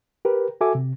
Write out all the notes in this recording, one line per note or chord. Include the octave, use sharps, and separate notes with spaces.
G4 A#4 B4
F#4 A4 E5 G#5 D6
C3